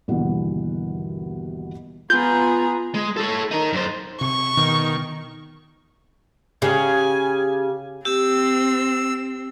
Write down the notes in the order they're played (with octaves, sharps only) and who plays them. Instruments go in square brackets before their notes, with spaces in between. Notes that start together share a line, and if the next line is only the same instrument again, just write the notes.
[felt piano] G1 D#2 B2 E3 F#5
[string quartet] B3 G#4 A#5 [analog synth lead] F4 [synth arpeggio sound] G6
[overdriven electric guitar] G#3
A4 C#5
D#4 A#4
F#2 C5
[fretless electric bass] C3 [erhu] C#6
[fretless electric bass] B2 [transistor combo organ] D#3
[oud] C#3 [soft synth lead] G4 [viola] G#5
[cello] C4 [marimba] G4 [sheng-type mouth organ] E6